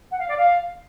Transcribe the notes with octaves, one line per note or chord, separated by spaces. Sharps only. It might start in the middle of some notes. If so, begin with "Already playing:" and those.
F#5
F5
D5
F5